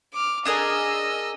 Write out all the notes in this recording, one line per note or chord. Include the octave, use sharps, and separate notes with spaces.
D6 F6
D4 G#4 A#4 D#5 E6